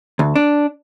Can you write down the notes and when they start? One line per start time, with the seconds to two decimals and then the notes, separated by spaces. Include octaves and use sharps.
0.19 D2
0.35 D4